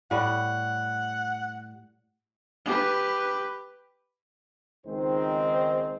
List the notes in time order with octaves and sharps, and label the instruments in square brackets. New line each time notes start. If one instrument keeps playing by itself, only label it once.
[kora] A2 G3 [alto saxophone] F#5
[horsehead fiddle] G4 B4
[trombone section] C#2 D#3 G#3 C4 D#4 C5